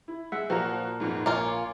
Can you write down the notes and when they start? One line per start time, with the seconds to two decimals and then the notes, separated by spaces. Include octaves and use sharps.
0.08 E4
0.32 G#3 E5 F#5
0.50 A#2 F3 F#4 A#4 A#5 F#6
1.00 A1 F2 G#2
1.26 A#1 A#3 F4 C#5 G#5 D6